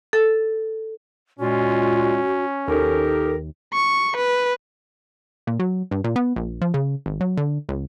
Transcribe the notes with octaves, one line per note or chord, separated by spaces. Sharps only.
A4
A#2 G#3 C#4 F4 F#4
D#2 D#4 G4 A4 A#4
C#6
B4
A#2
F#3
G2
A#2
B3
A#1
F3
C#3
G#1
F#3
D3
C#2